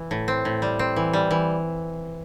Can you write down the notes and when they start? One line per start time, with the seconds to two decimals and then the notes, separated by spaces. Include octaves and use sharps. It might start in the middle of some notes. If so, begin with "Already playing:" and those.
Already playing: E3
0.11 A2
0.28 C4
0.45 A2
0.62 G3
0.79 C4
0.96 E3
1.13 G3
1.31 E3